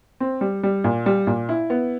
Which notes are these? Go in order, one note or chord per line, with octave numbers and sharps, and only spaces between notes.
C4
G3
G3
A#2
G3
A#2
E4
B3